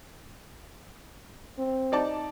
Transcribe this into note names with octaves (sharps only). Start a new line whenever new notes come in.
C4
D#4 D5 A5